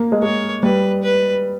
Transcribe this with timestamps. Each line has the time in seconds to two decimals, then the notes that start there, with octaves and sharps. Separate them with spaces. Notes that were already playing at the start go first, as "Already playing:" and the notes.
Already playing: A#3
0.12 G#3
0.22 G#3 C#5
0.63 G3 B4
1.03 B4